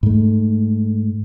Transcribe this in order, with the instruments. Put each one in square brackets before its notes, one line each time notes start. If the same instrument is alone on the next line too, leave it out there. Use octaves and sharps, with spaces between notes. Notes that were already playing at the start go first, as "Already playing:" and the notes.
[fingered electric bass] G#2 A3